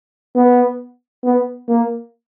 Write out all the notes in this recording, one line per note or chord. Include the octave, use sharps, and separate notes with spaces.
B3
B3
A#3